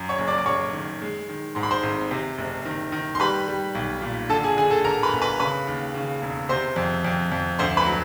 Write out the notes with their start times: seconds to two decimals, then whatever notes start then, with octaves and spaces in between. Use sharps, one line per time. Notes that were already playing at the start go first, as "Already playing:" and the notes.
Already playing: F#2
0.09 C#5 C#6
0.18 F#1
0.28 D5 D6
0.38 D6
0.46 F#1 C#5 C#6
0.73 D#3
1.01 G#3
1.29 D#3
1.55 G#2 C6
1.63 B5
1.71 C5 C6
1.83 G#1
2.11 C3
2.38 F#1
2.65 D#3
2.92 D#3
3.15 C6
3.20 G3 B4 B5
3.48 G3
3.75 B1
4.02 A#2
4.29 D3 A4 A5
4.43 G#4 G#5
4.57 D3 G#4 G#5
4.70 A4 A5
4.84 D3 A#4 A#5
5.03 B4 B5
5.13 G1
5.22 B4 B5
5.39 C#3 B4 B5
5.67 D#2
5.94 C#3
6.21 E1
6.49 C3 C5 C6
6.76 F2
7.04 F2
7.32 F2
7.59 D2 C5 C6
7.77 B4 B5
7.86 F#3